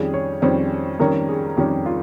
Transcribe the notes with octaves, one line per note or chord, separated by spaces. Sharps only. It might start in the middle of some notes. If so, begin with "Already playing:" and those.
Already playing: F2 D#3 G3 C#4 G#4
C#5
F2 D#3 G3 C#4 C5
F2 D#3 G3 C#4 A#4
G#4
F2 D#3 G3 C#4 G4
F4